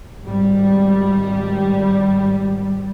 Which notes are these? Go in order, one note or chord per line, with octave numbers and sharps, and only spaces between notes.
G#1 G3